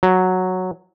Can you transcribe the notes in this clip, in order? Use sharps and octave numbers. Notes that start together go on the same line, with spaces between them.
F#3